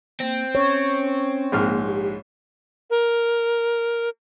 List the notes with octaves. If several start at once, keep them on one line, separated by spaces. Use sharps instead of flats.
A#3 C4
C#4 C#5
A#1 G#2 A#3 F6
G4
A#4